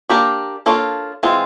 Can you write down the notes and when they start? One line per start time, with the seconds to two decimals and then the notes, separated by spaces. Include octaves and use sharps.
0.09 A#3 D4 G4 A#4 D5
0.66 A#3 D4 F4 A4 C#5
1.23 E3 G#3 C4 F4